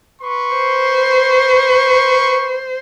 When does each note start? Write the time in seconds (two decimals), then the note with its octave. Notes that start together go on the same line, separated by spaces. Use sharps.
0.22 B4 C6 C#6
0.57 C5